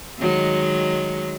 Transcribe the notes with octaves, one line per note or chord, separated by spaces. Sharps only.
D#3 F#3 G#3